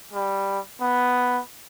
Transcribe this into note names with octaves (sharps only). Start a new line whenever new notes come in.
G3
B3